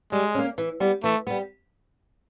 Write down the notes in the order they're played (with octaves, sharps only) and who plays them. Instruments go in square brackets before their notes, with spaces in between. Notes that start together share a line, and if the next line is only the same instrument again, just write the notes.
[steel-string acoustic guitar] G3 [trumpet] G#3
[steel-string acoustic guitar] A#3 C#4
E3
G3 B3
[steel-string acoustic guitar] E3 [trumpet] A3
[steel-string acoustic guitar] G3 B3